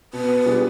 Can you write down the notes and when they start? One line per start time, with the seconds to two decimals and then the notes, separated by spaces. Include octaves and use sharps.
0.13 B2 B4
0.46 G3 D4 F4 G#4